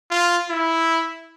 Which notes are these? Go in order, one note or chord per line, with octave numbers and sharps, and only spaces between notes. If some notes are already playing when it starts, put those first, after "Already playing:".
F4
E4